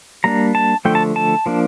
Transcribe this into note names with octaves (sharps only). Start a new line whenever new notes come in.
G3 A#3 D4 A#5
A5
D3 F3 A3 G5
A5
A5
F3 A#3 D4